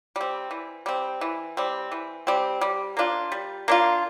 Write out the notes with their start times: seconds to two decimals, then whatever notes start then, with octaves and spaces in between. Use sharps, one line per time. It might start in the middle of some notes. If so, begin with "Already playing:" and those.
0.16 G3 C4
0.51 E3
0.86 G3 C4
1.21 E3
1.57 G3 C4
1.92 E3
2.27 G3 C4
2.61 G3
2.97 A#3 D4 F4
3.32 G3
3.68 A#3 D4 F4